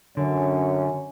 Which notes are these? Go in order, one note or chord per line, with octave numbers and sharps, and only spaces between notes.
F#2 D3 C#4